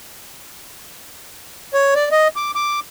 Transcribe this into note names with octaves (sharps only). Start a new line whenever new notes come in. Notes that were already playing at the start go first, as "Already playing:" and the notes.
C#5
D5
D#5
D6
D6